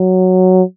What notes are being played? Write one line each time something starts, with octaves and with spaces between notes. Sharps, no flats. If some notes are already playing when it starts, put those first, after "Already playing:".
Already playing: F#3